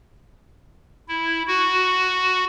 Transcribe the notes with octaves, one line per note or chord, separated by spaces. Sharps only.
E4
F#4